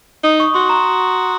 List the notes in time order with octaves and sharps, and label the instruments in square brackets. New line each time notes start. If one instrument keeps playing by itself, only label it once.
[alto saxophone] D#4 [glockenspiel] D#6
[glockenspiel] C#6
[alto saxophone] F#4 [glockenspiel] C6
[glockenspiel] A#5